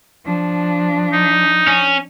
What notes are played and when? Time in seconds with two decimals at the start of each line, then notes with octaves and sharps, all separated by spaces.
0.25 F3 D4
1.13 D#4
1.67 C#4